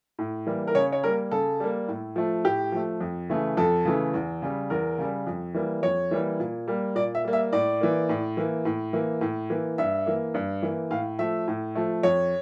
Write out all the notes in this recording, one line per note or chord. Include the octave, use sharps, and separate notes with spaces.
A2
E3 G3 A#3
A#4
C#3 C#5
C#5
G3 A#3 A#4
C#3 A4
G3 A#3
A2
F3 A3
A2 G4
F3 A3
F2
C#3 E3 A3
F2 A4
C#3 E3 A3
E2
C#3 G3
E2 A#4
C#3 G3
F2
E3 G3 A#3
F2 C#5
E3 G3 A#3
A#2
G3 A#3
A#2 D5
E5
G3 A#3
E5
A2 D5
E3 A#3
A2
E3 A#3
A2
E3 A#3
A2
E3 A#3
G2 E5
E3 A#3
G2
E3 A#3
A2 F5
F3 A3 E5
A2
F3 A3
F2 C#5